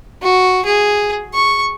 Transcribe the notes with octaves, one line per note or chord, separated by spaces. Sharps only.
F#4
G#4
C#6